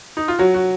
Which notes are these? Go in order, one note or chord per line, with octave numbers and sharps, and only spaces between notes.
D#4
F4
F#3 F#4
F#4